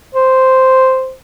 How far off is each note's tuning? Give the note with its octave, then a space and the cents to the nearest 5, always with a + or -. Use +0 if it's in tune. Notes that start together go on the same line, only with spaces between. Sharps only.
C5 -5